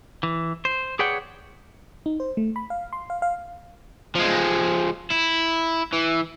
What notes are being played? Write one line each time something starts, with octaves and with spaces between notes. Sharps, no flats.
E3
C5
G#4 B4 C#5 D5 F#5 G5
D#4
C5
A3
B5
F5
C6
F5
F5
F3 G#3
E4
E3